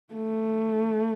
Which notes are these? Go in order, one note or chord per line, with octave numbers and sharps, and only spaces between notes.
A3